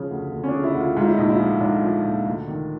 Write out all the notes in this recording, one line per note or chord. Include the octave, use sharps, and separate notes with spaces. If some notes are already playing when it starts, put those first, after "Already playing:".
Already playing: C#3 F3
D2
D2
C#4
D4
C#3
E4
D2
F4
G#2 F4
E4
A#1 D#4
E4
F3
G#2 D4
F3
A#1
D2
D#3